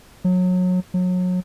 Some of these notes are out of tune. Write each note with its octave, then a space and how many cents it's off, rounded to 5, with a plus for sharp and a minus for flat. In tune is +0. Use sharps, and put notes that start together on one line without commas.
F#3 -25
F#3 -30